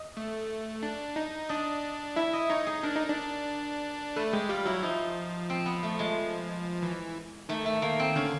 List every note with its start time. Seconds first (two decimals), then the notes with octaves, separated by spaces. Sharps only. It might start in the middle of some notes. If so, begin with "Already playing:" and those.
Already playing: D#5
0.17 A3
0.83 D4
1.16 D#4
1.49 D4 D#5
2.16 E4 E5
2.33 D#5
2.50 D#4 C#5
2.67 G#4
2.83 D4 A#4
2.96 D#4
3.09 D4
4.16 A3 B4
4.33 G#3 G4
4.49 G3 F4
4.65 F#3 E4
4.83 F3 D#4
5.50 C4
5.66 B3
5.83 A3
5.99 G#3
6.82 E3
7.49 D#3 A3
7.66 A3
7.82 D#3 A#3
7.99 C4
8.16 D3 C#4